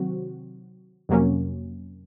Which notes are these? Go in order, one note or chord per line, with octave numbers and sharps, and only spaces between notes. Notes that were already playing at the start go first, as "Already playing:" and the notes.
Already playing: C3 D#3 F#3 C4 F#4
F2 C3 F#3 A#3 C#4